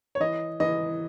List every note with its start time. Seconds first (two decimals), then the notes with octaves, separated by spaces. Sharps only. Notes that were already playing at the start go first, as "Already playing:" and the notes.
0.15 C#5
0.20 E3 D#5
0.60 E3 D#5